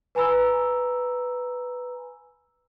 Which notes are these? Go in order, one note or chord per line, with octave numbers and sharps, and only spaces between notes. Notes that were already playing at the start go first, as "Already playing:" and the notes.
B4 G#5 A#5 B5 E6